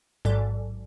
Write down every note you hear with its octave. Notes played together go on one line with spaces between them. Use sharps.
A1 G#2 F#3 A4 D5